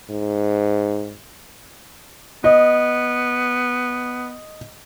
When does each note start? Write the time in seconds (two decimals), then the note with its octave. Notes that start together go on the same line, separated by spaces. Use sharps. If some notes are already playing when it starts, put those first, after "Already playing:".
0.10 G#2
2.44 B3 D#5